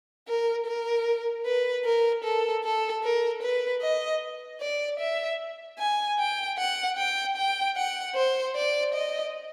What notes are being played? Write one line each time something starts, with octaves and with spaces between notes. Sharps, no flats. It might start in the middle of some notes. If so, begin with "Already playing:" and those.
A#4
A#4
B4
A#4
A4
A4
A#4
B4
D#5
D5
E5
G#5
G5
F#5
G5
G5
F#5
C5
D5
D#5